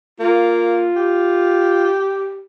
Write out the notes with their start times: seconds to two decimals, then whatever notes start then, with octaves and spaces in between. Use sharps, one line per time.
0.20 A#3 F4
0.96 G4